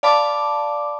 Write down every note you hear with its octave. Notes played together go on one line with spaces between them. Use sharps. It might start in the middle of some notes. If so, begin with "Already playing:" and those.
D5 F5 A5 B5 D6